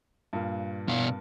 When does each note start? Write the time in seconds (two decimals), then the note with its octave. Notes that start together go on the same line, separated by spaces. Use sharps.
0.33 G2 A#2
0.88 B2 F5